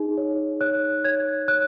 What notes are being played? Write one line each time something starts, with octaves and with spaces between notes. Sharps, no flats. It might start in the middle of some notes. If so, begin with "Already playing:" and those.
Already playing: D#4 G#4
C#5
C#5 F#6
C#5 G#6
C#5 F#6